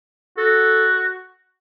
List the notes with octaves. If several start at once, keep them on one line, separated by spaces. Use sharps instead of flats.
F#4 A4